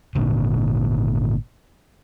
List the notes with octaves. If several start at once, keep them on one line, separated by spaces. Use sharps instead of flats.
G#1 A#2 D3